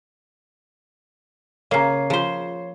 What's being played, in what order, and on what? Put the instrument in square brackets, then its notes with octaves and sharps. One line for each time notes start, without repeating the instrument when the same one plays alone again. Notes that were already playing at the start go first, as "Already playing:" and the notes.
[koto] C#3 A#3 [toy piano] A#4 A#5 [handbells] C#5 C7
[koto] F3 C5 [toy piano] F4 G#4